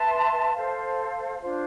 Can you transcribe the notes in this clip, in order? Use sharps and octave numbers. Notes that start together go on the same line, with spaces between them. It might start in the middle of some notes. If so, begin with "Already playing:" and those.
Already playing: B4 E5 A5 C6
A4 C5 F5
D4 F4 C5